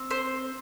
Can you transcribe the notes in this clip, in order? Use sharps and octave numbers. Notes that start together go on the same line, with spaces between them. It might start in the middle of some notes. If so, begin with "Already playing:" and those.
Already playing: C4
C5